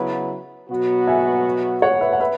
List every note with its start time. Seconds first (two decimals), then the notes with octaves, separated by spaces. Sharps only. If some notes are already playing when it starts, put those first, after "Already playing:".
Already playing: C#3 F#3 B3 E4 B4
0.70 B2 F#3 B3 F#4
1.07 E5 G#5
1.82 C#5 F#5
2.01 B4 E5
2.13 F#5
2.20 B4 E5